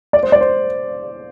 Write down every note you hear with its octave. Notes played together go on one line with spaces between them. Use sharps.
D5
C5
D5
C5